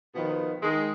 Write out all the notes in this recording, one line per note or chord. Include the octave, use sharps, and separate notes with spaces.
B2 D#3 F3 B3
D#3 G#3